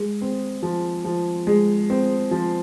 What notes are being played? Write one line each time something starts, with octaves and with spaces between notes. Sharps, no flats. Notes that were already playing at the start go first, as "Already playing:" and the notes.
Already playing: G#3
C4
F3
F3
G#3
C4
F3